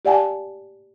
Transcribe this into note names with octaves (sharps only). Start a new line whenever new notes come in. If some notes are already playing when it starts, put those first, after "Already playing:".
G4 D5 F#5 G#5 A5